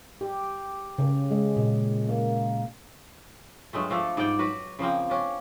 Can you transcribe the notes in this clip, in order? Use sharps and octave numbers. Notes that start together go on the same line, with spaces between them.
G4
C#3
G#3
A#2
A#3
G2 F#3 G#3 A3
F3 A3 D4 A4
G#2 G3 D5 G5
F#3 F#4 B4
C#3 F3 A#3 C4
C#4 D4